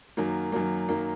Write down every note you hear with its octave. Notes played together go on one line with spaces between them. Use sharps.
F#2 D#3 F#3 A#3
F#2 D#3 F#3 A#3
F#2 D#3 F#3 A#3